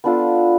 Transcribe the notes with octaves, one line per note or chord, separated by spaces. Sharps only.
B3 D4 F4 A4